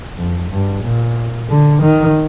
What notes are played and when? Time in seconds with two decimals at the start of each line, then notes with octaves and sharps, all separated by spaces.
0.17 F2
0.50 G2
0.83 A#2
1.49 D3
1.82 D#3